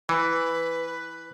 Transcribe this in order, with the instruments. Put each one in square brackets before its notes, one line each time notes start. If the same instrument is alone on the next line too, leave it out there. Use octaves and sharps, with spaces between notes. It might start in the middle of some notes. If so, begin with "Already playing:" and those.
[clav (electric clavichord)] E3 [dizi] B4